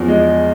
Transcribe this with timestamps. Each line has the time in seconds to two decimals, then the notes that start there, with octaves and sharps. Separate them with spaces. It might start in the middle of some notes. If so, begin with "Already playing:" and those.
Already playing: E2 F3
0.08 G#3